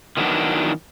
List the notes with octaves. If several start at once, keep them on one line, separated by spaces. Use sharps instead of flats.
D#3 E3 F#3 B3 D4